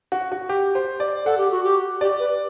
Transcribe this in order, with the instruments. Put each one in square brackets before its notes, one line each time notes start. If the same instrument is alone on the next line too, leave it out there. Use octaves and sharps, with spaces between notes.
[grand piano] F#4
F#4
G4
C5
D5
[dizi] A4 [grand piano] F#5
[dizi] G4
F#4
G4
[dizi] G4 [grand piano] D5
[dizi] B4